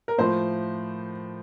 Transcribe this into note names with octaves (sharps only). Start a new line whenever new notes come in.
A#4
A2 F3 C5